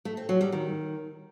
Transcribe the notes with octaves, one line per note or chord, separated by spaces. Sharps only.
A3
C4
F#3
G3
D#3